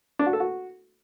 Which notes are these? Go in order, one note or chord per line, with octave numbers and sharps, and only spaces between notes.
D4
F#4
A4
F#4